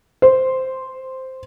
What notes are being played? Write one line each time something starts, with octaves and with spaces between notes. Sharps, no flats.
C5